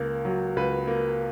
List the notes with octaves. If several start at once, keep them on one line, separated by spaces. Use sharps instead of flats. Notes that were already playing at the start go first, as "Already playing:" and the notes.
Already playing: C#2 A#3
F#3
C#2 B4
A#3